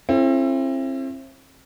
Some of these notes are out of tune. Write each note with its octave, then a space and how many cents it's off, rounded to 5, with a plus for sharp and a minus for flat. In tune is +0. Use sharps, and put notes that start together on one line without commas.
C4 +35 E4 +30 A4 -25